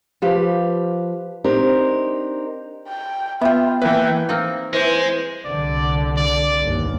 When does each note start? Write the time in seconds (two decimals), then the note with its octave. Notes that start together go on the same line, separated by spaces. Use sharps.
0.22 F3 G4 B4 F5
1.44 C4 D4 D#4 G4 A#4
2.88 G5
3.41 B3 F4 E5 G5
3.82 E3 A#3 B4 E5 G5
4.29 A#3 C4 D#4
4.73 E3 G#3 C5
5.45 C2 D3 D5
6.17 D5
6.62 G1 D#2